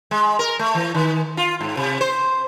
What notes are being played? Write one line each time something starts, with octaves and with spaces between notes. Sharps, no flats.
G#3
A#4
A3
E3
D#3
F4
G#2
C3
C5